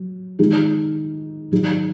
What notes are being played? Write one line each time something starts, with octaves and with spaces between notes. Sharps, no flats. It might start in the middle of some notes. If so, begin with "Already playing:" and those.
Already playing: F#3
D#3 G#3 D#4 G#4
D#3 F#3 D#4 G#4